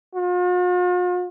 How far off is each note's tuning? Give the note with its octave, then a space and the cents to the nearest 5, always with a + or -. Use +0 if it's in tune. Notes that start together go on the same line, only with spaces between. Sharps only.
F4 +45